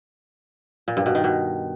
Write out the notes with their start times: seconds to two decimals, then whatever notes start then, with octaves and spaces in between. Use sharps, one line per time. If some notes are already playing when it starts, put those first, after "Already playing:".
0.88 A#2
0.97 G2
1.06 B2
1.15 D#3
1.24 B2